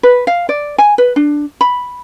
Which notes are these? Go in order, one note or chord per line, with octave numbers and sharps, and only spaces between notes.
B4
F5
D5
G#5
B4
D4
B5